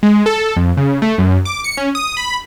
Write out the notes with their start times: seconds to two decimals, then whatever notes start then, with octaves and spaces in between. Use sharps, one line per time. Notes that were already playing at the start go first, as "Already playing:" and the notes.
0.03 G#3
0.26 A4
0.42 A4
0.56 F2
0.77 C#3
1.02 A3
1.18 F#2
1.45 D6
1.64 C#7
1.77 C#4
1.95 D#6
2.17 B5